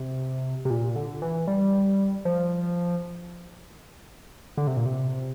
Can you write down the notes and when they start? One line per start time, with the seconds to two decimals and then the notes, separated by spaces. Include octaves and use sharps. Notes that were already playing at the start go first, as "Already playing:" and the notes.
Already playing: C3
0.65 C3
0.70 A#2
0.96 D3
1.22 E3
1.47 G3
2.25 F3
4.57 D3
4.67 C3
4.77 A#2
4.86 C3